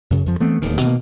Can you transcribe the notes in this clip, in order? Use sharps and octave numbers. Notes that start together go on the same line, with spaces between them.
F#2 C#3
F2 F3
E3 A3 B3 C4
D1 D#2 D#3
B2 D#3 G#3 A#3